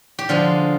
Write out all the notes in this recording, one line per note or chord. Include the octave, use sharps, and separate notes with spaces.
G4
D3 F3 G#3 F4